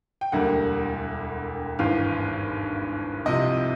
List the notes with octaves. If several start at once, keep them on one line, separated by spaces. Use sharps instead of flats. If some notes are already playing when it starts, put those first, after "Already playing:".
G5
E1 D2 D3 G3 A#3 F#5
G#1 G2 E3 F5
C2 C3 F3 D#5